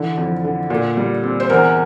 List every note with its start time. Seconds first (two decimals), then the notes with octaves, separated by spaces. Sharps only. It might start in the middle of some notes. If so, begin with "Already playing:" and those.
Already playing: D3 E3 A4
0.17 F2
0.44 D3
0.70 A#2
0.97 G3
1.23 C4
1.40 C5
1.50 E2 A#4